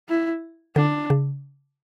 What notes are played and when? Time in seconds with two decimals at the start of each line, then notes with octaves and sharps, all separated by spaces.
0.09 E4
0.76 D3 D4
1.10 C#3